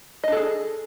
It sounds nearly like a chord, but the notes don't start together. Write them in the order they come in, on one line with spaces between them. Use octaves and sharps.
D#5 D4 A4 G#4